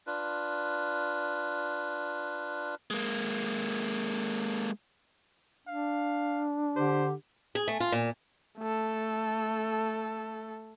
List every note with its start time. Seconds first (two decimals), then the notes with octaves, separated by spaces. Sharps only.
0.07 D4 F4 B4
2.91 G#3 A#3
5.67 D4 F5
6.76 D3 G4 C5
7.55 G#4
7.68 A3
7.80 F4
7.92 A#2
8.58 A3 A4